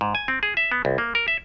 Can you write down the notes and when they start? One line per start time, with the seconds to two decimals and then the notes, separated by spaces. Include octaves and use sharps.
0.01 G#2
0.15 G#5
0.28 C4
0.43 G#4
0.57 E5
0.72 B3
0.85 C2
0.98 A#3
1.15 A#4
1.28 E5